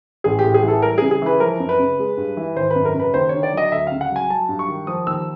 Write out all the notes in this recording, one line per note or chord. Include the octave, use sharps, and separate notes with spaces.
A1 G#4
G4
A2
G#4
E3
A4
G3 A#4
C#3 G#4
G#4
E3 B4
F3 A#4
F#2
B4
C#3
G#3
G2
E3
G#1 C5
B4
F#2
A#4
C#3
B4
D#2 C5
D3 C#5
D5
F#3 D#5
D2 E5
C#3 F5
F#5
F#3
G#5
F#3 A5
G2
C#6
D#3
F3 D#6
D#2 E6